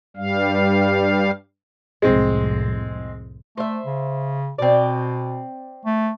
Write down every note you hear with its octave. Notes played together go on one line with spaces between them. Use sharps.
G2 G3 F5
C2 F2 A2 G#3 C4
A3 C5 E5
C#3
B2 C4 D5
A3